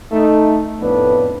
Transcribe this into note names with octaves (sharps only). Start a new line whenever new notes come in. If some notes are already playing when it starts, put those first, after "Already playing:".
A3 D#4
F2 A2 B3 D4 B4